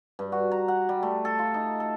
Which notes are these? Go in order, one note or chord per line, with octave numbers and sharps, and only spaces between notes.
G2
F#4
A#5
F#5
G3
A3
A4
F4
D#4
A4